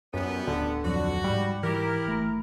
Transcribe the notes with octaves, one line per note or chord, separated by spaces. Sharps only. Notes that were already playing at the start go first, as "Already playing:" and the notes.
F#2 F3 G3 B3
D1 D3
F2 F3 F#3 F#4
G#2 G3 B5
E3 E4 G4 A#4
G1 A3 B5